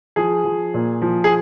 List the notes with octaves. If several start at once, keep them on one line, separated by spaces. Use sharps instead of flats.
F3 G#4
F3
A#2
F3
G#4